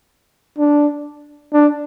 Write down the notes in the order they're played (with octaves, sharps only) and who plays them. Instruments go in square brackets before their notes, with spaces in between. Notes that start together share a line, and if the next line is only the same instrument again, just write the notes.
[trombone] D4
D4